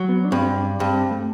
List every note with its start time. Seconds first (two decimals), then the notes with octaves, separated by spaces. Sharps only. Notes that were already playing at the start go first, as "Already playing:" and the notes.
Already playing: F#3
0.09 B3
0.25 D4
0.32 G2 C4
0.56 D4
0.80 G2 C4
1.11 A3